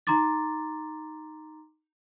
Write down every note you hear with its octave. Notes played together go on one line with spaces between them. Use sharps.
D#4 A#5 C6 D6 A6